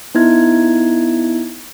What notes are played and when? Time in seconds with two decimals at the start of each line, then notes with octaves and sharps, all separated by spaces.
0.15 B3 D#4 E4 G#6